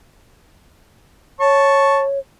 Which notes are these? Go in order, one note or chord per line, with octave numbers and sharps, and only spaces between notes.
C#5 A5 C#6